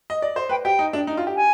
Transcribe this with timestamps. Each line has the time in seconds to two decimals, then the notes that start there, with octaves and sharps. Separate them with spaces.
0.10 D#5
0.22 D5
0.36 C5
0.49 B4 G5
0.64 G4 G5
0.79 D#4
0.93 D4
1.07 D#4
1.17 F4
1.27 G4
1.36 G#5